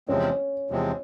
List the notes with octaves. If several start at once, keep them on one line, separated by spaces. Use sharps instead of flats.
E2 C3 F3 G#3 C4 C#4
E2 C3 F3 G#3 C4